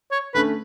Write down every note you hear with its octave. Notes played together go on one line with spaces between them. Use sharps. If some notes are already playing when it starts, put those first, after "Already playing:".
C#5
D3 A3 C#4 B4